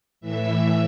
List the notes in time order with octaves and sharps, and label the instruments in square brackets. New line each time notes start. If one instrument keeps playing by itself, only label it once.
[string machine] A2 E3 E5